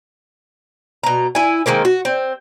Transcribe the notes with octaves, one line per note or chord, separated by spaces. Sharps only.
B2 A#5
E4 G#5
D#3 G#3 A#3 C4
F#4
C4